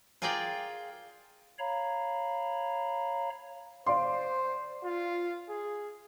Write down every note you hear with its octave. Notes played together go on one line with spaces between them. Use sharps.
F4 G#4 A#4 D5 F5 G5
C#5 F5 A#5 B5
C5 D5 F5 C6
F4
G#4